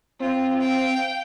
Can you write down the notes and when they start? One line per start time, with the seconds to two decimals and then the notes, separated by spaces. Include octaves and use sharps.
0.20 C4 F4
0.61 F5 G5